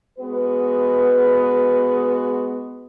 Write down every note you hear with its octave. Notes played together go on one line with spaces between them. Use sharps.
G#3 B3 F#4 B4